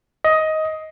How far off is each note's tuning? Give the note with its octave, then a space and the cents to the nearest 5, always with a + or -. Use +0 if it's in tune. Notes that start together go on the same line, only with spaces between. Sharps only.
D#5 +15